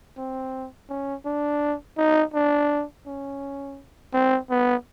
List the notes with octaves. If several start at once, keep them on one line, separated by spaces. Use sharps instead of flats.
C4
C#4
D4
D#4
D4
C#4
C4
B3